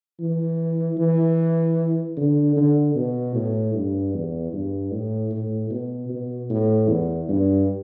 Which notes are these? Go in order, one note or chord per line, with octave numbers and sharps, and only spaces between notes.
E3
E3
D3
D3
B2
A2
G2
E2
G2
A2
A2
B2
B2
A2
E2
G2